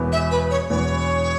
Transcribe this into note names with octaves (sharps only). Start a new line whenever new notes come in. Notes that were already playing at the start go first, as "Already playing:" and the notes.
Already playing: E1 E2 E3 B3
E5
B4
C#5
E1 E2 E3 B3 C#5